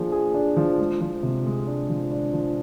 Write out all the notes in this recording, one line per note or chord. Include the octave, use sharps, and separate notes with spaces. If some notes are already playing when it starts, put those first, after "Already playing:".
Already playing: F3 A#3 D4 G#4
G#4
D4
F3
G#3
F3
C3
G#3
D4
F3
D4
F3